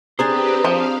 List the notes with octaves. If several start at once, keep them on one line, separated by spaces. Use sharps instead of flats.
C4 D4 G4 G#4 B4 C5 A#5 D#6
F3 F5